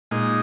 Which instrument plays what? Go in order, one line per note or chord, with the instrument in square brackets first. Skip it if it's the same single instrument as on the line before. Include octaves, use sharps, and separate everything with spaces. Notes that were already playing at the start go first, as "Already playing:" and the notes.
[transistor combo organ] A#2 G#3 D#4